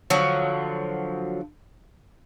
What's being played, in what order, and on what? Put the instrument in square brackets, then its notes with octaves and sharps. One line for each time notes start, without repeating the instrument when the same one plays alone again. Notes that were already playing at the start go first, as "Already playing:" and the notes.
[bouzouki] D3 F3 F#3